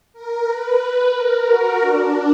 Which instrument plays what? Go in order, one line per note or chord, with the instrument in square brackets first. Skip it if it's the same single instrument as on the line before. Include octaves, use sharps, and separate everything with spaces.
[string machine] A#4
B4
B4
A#4
F#4
D4